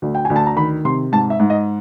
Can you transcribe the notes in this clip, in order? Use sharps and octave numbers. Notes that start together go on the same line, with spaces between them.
D2
G5
D2 G#5
A5
A#5
D#3 B5
C3 C6
G#2 A5
E5
G#2
D#5